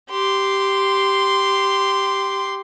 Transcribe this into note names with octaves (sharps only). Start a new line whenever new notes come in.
G4 C6